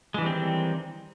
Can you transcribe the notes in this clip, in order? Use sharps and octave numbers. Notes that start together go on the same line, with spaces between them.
D#3 E3 G3 G#3 C4